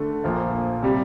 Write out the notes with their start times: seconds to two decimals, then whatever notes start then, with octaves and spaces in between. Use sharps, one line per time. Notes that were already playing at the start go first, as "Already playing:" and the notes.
Already playing: D3 A3
0.24 A#1 A#2 F3 A#3
0.83 C3 G3